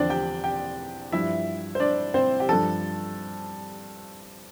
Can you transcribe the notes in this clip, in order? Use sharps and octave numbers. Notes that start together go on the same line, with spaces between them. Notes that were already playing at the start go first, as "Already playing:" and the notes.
Already playing: E2 D3 F3 C4 D4 C5 D5
G4 G5
G4 G5
G2 F3 E4 E5
C5
D4 D5
C4 C5
G4
G2 F3 A4